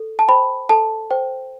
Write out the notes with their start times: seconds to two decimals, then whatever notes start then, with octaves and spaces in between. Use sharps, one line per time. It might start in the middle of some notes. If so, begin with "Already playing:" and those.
Already playing: A4
0.19 A5
0.28 C5 G5 B5
0.69 A4 A5
1.11 C5 G5